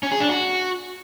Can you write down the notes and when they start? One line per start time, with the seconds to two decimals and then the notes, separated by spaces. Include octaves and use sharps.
0.03 C#4
0.12 G#4
0.20 D4
0.29 F#4